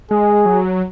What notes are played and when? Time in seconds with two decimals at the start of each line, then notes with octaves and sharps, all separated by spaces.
0.11 G#3 G#4
0.46 F#3